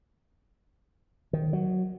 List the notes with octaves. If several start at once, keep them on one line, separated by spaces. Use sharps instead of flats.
D#3
F#3